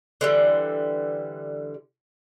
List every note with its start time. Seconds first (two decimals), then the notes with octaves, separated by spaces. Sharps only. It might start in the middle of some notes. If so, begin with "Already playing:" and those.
0.21 D3 E3 G3